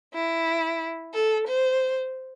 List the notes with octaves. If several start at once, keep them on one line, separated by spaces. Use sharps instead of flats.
E4
A4
C5